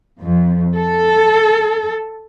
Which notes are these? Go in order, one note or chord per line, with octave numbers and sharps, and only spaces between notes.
F2
A4